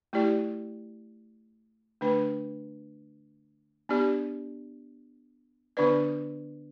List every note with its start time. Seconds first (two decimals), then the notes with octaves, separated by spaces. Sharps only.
0.13 A3 E4 G4 D5
2.01 D3 A3 D4 B4
3.89 B3 D4 G4 D5
5.77 D3 B3 D4 B4 D5